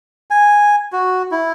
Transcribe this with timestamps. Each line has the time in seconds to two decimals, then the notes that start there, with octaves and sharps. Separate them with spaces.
0.31 G#5
0.93 F#4
1.31 E4